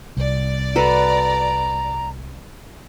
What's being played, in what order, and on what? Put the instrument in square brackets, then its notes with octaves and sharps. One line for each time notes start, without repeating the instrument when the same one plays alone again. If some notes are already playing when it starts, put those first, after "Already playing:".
[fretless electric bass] C2 [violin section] D5
[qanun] F#4 A4 B4 [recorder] A#5